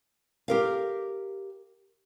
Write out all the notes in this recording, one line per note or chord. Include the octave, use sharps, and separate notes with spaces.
G4 A#4 F5